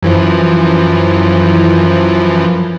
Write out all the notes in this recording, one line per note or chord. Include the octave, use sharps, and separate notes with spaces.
F#2 E3 F3